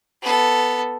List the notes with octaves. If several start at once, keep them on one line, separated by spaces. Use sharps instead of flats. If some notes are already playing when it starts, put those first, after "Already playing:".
B3 A4